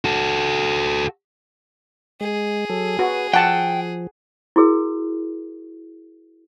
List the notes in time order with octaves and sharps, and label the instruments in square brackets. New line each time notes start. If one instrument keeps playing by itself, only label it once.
[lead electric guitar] F#4 A4
[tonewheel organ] G#3 [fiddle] G#4
[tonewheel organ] F#3 A4
[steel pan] F#4 [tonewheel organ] B4 G#5
[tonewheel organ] F3 [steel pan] F#5 A5 [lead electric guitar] G5
[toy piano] E4 F#4 G#4 A#4